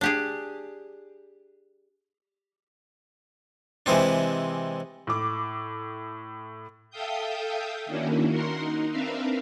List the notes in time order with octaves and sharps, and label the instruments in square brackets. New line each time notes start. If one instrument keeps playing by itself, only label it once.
[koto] D4 G4 G#4
[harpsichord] C3 E3 G#3 C4 D4
[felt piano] A2 D6
[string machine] A4 E5 F5 G5 D#6 G6
D#3 A#3 C#4 D4 E4 F#4
F#4 A#4 F#5 C6
D#4
C4 D4 A#4 B4 E5 F5